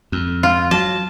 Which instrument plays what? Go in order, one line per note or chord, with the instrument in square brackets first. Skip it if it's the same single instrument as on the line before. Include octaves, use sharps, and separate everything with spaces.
[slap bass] F2
[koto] F4
[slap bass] F#3 [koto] A5